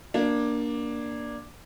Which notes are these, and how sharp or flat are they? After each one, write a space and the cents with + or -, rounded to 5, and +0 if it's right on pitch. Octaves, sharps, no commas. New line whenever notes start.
A#3 +15 D4 +0